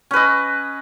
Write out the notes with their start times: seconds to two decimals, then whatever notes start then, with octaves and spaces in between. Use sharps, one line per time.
0.11 C#4
0.13 B4
0.16 D#5